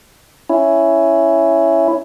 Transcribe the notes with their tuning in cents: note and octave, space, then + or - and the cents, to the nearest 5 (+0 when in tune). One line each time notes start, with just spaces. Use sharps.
C#4 +0 E4 +5